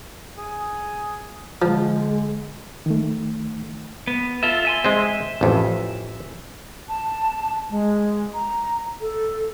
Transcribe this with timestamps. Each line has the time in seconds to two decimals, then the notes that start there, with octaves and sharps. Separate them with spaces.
0.36 G#4
1.62 D3 F3 G#3
2.86 D#3 A3
4.07 B3
4.43 F4 A4 E5
4.65 E5 G#5 C6
4.84 G#3 C4
5.41 A1 F2
6.89 A5
7.70 G#3
8.34 A#5
9.01 A4